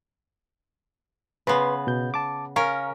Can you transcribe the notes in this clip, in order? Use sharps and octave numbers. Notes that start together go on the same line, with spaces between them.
C#3 B3 B4 C6
B2 G6
A5 D6
C#4 A#4 F5 A#5 C#6